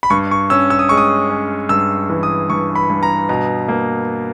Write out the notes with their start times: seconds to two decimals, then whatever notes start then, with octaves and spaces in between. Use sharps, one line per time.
0.03 B5
0.10 G2 C#6
0.31 C#6
0.50 C#4 E6
0.70 E6
0.79 D#6
0.89 G#3 C#6
0.97 D#6
1.30 C#4
1.69 G2 E6
2.10 E3
2.23 D#6
2.50 G2 C#6
2.75 B5
2.90 G2
3.03 A#5
3.29 B2 A#5
3.68 A#3